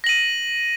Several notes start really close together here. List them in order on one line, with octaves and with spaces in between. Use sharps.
A#6 F#7 D#7